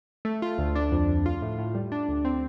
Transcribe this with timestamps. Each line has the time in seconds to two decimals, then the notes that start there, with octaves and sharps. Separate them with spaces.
0.25 A3
0.42 F4
0.58 D2
0.75 D4
0.92 F2
1.09 F2
1.26 F4
1.42 A2
1.58 A2
1.75 G3
1.92 D4
2.09 D2
2.25 C4